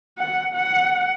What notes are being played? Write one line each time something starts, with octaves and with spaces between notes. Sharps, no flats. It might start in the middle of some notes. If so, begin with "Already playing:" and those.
F#5
F#5